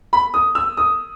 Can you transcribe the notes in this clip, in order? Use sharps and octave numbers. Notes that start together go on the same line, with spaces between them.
B5
D#6
E6
D#6